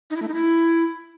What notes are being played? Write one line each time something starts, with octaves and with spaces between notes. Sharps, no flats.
D#4
E4
A3
D#4
E4